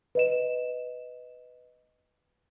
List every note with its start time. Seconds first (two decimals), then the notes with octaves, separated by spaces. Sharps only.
0.15 B4 D#5 E7